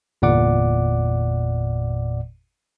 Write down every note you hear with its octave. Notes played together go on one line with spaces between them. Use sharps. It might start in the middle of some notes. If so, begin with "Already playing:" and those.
G1 E2 A#2 D5 F#5 D6